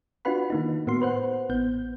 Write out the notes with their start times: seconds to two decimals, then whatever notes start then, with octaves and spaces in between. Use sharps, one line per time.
0.25 D4 F4 F#4 B4 F#5 B5
0.50 D#3 A#3 D#4
0.87 A2 A#3 B3 F#4 C6
1.02 B4 C5 F#5
1.49 A1 B3 G6